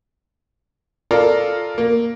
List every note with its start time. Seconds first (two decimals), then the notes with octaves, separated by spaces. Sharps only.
1.11 F4 A4 A#4 D5
1.78 A#3